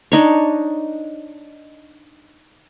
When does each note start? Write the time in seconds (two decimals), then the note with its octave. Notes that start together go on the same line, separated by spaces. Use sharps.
0.12 D4 D#4 C#5